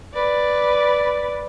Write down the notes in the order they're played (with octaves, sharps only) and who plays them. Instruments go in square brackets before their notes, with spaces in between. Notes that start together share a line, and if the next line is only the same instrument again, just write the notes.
[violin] B4 D5